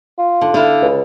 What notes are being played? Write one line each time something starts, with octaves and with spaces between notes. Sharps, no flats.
F4
D3
D3 E4 F5
C#2